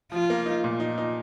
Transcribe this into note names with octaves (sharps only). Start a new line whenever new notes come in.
F3 F4
A#3
D#4
A#2
D#4
D#4